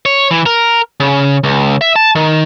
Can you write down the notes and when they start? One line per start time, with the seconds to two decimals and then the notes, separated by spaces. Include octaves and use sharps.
0.06 C#5
0.31 E3
0.46 A#4
1.00 C#3
1.44 C#2
1.81 E5
1.96 A5
2.15 D#3